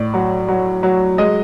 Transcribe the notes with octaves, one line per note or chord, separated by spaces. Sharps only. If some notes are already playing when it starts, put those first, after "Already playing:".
Already playing: A2 D5
F#3
F#3
F#3
G#3 D#5